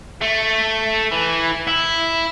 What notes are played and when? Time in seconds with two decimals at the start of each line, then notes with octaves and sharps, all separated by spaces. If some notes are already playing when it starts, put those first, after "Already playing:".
0.21 A3
1.12 E3
1.68 E4